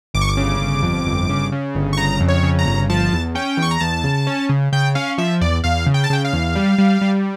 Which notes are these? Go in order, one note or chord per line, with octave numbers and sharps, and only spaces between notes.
G1 D6
C#6
D6
C#3
G1
F2
G1
C#3
C#3
G1
C#6
C#3 A#5
F2
C#5
C#3
A#5
G1
F3 A5
E2
C#4 G5
E2
C#6
A#5
E2 A5
C#3
C#4
C#3
C#3 G5
C#4 F5
F3 E5
E2 D5
E2 F5
C#3
G5
A5
C#3 G5
F5
E2
G3
G3
G3